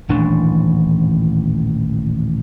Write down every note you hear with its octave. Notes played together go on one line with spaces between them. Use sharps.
D#1 A1 E3 D4